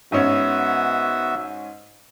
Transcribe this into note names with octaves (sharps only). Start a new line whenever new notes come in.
G#2 B3 C#4 F#4 E5